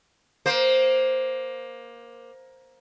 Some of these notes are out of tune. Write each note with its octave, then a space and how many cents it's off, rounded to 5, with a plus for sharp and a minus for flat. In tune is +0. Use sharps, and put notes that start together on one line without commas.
A#3 +15 C5 +0